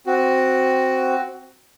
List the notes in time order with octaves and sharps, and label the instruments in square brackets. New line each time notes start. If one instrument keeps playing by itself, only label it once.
[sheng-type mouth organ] C4 F#4